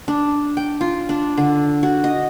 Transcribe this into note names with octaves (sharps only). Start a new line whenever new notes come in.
D4
G5
F4
D4
D3
F#4
D#5